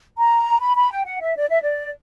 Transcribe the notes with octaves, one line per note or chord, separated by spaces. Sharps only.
A#5
B5
B5
G5
F#5
E5
D5
E5
D5